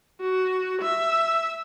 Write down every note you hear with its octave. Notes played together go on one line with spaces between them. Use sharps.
F#4
E5